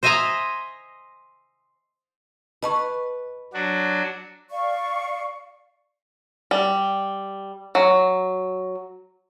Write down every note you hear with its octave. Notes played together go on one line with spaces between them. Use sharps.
C5 D#5 E5 G#5 A#5
B4 D#5 A5 C#6
F#3 D4 F#4
D5 F5 C#6
G3
F#3